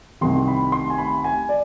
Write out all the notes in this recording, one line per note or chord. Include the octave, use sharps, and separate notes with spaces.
C2 C3 D#3 C6
B5
C6
G#5
B5
G#5
D5